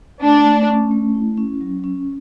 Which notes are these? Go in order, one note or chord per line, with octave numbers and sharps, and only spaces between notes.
A3 D4
A3
C#4
A3
E4
C#4
F#3
C#4